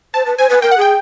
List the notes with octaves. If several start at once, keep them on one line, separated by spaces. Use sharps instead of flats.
C5 A5
B4
C5 G#5
B4
A#4 G5
F#5
G#4 G5